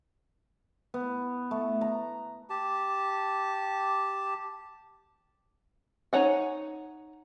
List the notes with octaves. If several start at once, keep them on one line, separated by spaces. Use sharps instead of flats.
B3
A3
A#5
G4 A5
D#4 C#5 F#5 G#5